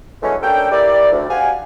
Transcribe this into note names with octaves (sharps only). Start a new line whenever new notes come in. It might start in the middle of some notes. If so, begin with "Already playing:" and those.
D3 E3 F#3 G#3 A3 C#4
A#3 C#4 D4 A4 G5
E4 G4 A#4 D5
D2
G4 F5 F#5 G#5